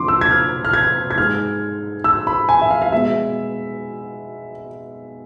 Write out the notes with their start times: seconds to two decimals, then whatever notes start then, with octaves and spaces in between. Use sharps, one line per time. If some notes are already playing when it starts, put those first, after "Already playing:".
Already playing: F2 D3 F3 C6 D6
0.08 E6
0.21 G#6
0.31 F6
0.65 F6
0.73 G#6
1.10 G#6
1.18 G#2 G#3 F6
2.04 E6
2.27 B5
2.49 G#5
2.61 E5
2.71 F5
2.82 F5
2.92 B2 G#3 E5